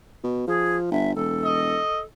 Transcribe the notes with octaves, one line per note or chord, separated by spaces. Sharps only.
B2
F3 G#4
G1 E5
E1 A4
D#5